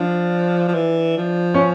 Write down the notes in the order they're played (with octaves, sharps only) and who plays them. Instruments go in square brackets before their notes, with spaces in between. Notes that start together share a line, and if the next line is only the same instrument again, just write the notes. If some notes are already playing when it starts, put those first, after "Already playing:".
Already playing: [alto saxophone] F3 [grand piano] D4
[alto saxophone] F3
E3
F3
[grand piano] C#4